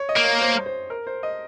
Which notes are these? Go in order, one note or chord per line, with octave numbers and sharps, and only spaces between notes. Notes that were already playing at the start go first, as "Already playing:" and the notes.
Already playing: C#5
D#5
A#3
C#5
C5
C5
A#4
C5
D#5